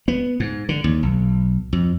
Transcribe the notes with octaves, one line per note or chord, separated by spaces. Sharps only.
B3
G#2
D3
D#2
B1
F2